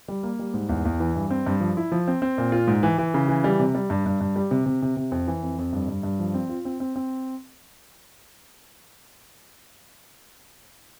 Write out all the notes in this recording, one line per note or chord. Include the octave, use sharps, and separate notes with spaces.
G3
A#3
G3
G#2
E2
E2
E3
G2
C4
G2
F3
E4
F3
C4
C4
A#2
F4
G#2
E3
E3
C#3
E3
G3
C3
G3
G2
G2
G2
G3
C3
C3
C3
C3
F2
E3
F2
F2
G2
G2
G2
F3
C4
F4
C4
C4
C4